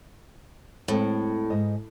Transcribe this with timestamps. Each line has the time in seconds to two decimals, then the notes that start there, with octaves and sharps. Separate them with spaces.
0.88 A2 G#3 C4 A4
1.50 G#2 D#5